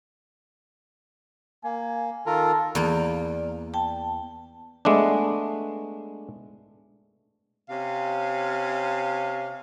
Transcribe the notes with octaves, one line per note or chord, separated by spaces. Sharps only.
A#3 G#5
D#3 F4 A4 A#4
E2 A#3 D5
G5 A5
G#3 A3 B3 D4
C3 C#4 F5